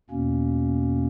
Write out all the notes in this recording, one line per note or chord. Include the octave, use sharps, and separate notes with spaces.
E2 B2 A#3 C#4